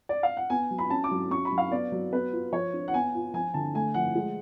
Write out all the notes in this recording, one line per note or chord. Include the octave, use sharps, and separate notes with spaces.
D5
F5
F#5
B3 G#5
F#3
B5
C#4 A5
D6
F#3
C#4 C#6
B5
F#3
F5
B3 D5
F#3
B3 B4
F4
F3 C#5
D4
F#5
B3 G#5
F4
F3 G#5
D3 A5
A3 G#5
F3 F#5
G#3